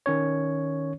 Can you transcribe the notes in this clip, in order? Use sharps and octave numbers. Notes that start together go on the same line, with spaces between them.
D#3 C#4 C#5